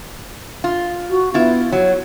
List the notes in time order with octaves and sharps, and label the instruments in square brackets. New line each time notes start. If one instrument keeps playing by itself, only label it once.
[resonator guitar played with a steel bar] F4
[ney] F#4
[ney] B3 [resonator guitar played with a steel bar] E4 F4
[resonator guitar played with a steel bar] F#3 [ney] C#5